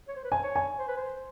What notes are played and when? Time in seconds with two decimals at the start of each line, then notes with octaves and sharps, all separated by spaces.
0.08 C#5
0.16 C5
0.24 B4
0.31 C5 G#5
0.43 C#5
0.56 G#5
0.79 C5
0.88 B4
0.97 C5